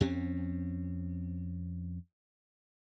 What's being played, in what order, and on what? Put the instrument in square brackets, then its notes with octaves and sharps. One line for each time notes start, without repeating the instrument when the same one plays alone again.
[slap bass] F2 C4 C#4